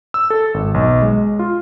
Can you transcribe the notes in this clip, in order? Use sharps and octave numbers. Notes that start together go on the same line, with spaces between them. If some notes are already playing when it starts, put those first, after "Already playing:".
E6
A4
G#1
B1
G#3
F4